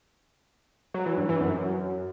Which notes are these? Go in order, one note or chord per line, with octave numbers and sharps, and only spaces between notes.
F#3
E3
G2
E3
F#2